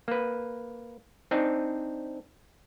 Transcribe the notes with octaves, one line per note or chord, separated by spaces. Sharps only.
A#3 B4
C4 D4 D#4